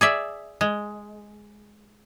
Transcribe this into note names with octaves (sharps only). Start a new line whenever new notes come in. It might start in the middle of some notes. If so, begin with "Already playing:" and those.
G#4 D5 E5
G#3